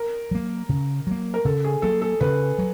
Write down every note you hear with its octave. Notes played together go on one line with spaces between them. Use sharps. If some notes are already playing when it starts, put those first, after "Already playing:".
Already playing: A#4
F#3 A#3
C#3
F#3 A#3
A#4
C#3 A4
G#4
F#3 A#3 A4
A4
C#3 B4
F#3